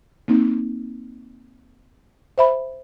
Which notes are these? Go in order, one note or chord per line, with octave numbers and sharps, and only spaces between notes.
A#3 C4 D#4
C5 E5 B5